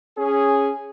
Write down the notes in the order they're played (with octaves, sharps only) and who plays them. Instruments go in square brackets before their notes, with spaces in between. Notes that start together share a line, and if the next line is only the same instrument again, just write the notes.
[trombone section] C#4 G#4